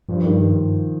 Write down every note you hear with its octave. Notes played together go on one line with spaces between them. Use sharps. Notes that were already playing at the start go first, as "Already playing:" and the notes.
G2 F3
D#3